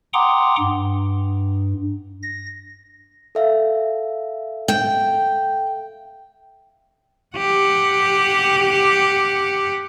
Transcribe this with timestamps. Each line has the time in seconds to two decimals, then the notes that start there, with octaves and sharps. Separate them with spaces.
0.13 F#5 G5 A#5 C6 D6 D#6
0.60 G2
2.23 A#6
3.35 A4 E5 F5
4.68 G5
7.36 G4 F#5